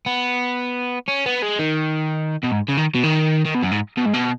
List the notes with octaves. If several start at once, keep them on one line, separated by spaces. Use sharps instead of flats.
B3
C#4
B3
G#3
D#3
B2
G#2
C#3
D#3
B2
D#3
D#3
B2
F#2
G#2
B2
G#2
B2